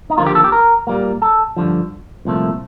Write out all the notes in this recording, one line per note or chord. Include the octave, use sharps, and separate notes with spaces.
D#4
D#2 D3 F3 A#3 F4
G4
A4
G4
A#4
A#2 G3 A#3
A4
G2 D3 F3
C2 A#2 F3 A3